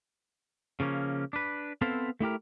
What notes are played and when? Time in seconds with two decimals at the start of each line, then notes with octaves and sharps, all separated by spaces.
0.80 C#3 F3 A#3 C#4
1.33 D4 B4
1.81 B3 C4 E4 A4 C5 F5
2.20 A3 E4 G4 A#4